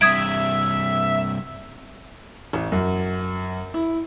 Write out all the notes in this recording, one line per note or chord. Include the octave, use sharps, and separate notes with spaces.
G2 C3 E5 D#6 G#6 D7
A1
F#2
E4